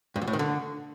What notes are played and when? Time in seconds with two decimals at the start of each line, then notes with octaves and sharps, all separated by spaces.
0.16 G2
0.22 E2
0.27 A2
0.33 D#3
0.39 D3